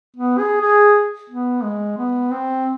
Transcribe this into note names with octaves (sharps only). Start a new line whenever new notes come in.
B3
G#4
G#4
B3
G#3
B3
C4